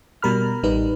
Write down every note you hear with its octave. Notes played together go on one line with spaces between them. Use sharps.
B2 G3 A#4 B5 F6
A1 G3 D#4 B4